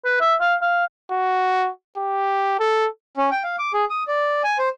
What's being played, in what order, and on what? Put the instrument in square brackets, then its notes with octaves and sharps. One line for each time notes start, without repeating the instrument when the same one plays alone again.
[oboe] B4
E5
F5
F5
[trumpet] F#4
G4
A4
[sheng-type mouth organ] C#4
G5
F5
D6
G#4
D#6
D5
G#5
C5